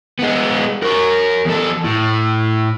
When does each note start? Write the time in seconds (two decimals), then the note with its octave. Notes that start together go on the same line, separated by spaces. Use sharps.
0.19 G#3 B3
0.83 A#4 C#5
1.45 E2 A4
1.84 A2